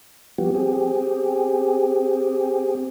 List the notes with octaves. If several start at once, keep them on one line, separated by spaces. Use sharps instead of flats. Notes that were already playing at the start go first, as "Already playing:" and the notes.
F3 G3 B3 F#4 G4
C4 G4 G#4